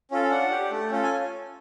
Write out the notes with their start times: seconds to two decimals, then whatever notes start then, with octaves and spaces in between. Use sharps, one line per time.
0.11 C#4 F4 A4
0.31 D4 F#5
0.51 G4
0.71 A3
0.91 C#4 F4 A4
1.03 G#5